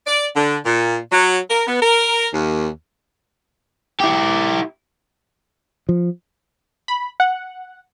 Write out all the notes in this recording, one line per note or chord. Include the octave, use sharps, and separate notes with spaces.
D5
D3
A#2
F#3
A#4
B3
A#4
D#2
E4 G4
F3
B5
F#5